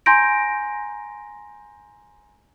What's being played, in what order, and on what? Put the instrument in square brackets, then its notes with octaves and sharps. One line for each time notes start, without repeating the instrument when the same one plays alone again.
[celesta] G#5 A#5 C6 G6 A#6 D7